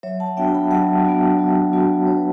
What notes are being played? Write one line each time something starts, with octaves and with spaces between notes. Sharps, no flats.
F#3 C#5 E5
F#5 A5
B3 D4 F#4 E5 G5
A5
G5 B5
F#3 F#5 A5
B3 D4 F#4
F#3
B3 D4 F#4
F#3 C#5
B4